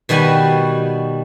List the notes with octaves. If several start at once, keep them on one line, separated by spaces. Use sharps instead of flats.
B2 D#3 G3 F#4 G#5